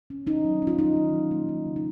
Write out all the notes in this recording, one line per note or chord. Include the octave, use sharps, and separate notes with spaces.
C#4
C#4 D#4
F#3
C#4
F4
C#4 D#4
D#3
F#3
A#3
A#3
C#3
D#4